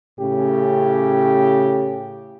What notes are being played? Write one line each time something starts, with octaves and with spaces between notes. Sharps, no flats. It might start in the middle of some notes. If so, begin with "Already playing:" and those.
A2 C#3 C#4 G4